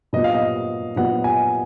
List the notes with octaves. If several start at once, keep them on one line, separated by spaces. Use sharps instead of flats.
A#2 F#3 B3 D#5
F5
D#5
A#2 F#3 B3 F#5
G#5